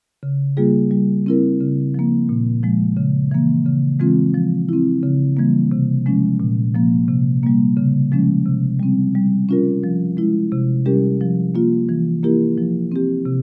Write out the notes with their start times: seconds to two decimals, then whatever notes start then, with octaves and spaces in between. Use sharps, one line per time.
0.23 C#3
0.57 G3 A#3 F4 G#4
0.91 G3
1.26 C4 E4 A#4
1.60 C#3
1.94 F3 A#3
2.29 A#2
2.63 F3 G#3
2.97 C#3
3.31 E3 A#3
3.66 C#3
4.00 E3 G#3 C4 F4
4.34 F3
4.69 C4 E4
5.03 C#3
5.37 E3 G3 A#3
5.72 C3
6.06 F3 G#3 C#4
6.40 A#2
6.75 F3 A#3
7.08 C3
7.43 G3 A#3
7.77 C#3
8.12 F3 G#3 C#4
8.46 C3
8.80 G3 C4
9.15 G3
9.49 C#4 F4 A#4
9.83 F3
10.17 G#3 E4
10.52 C3
10.86 G3 C#4 G4 A#4
11.21 F3
11.55 A#3 F4
11.89 E3
12.23 A#3 E4 G4 A#4
12.58 F3
12.92 C4 G4
13.25 C3